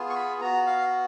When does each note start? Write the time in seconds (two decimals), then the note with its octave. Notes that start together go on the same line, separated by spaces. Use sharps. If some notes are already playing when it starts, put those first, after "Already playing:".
Already playing: B3 F4 G#4
0.10 C#6
0.16 B5
0.41 B3 F#4 A#5
0.67 F5